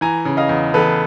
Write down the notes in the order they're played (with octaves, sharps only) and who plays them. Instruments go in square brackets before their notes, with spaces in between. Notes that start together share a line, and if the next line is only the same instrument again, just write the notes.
[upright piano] E3 G#5 A#5
C#3
D#5 F5
E2
E2 A4 B4